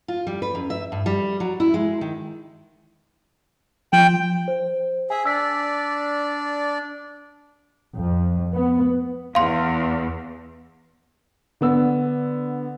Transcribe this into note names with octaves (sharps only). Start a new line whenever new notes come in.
F4
G3
B4
F#2
E5
G2
G3
F#3
E4
G#3
D#3
F3 G5
C5
G#4 E5 G#5
D4 D5 E6 B6
F2
B3
E2 F5 C6
D3 B3 E6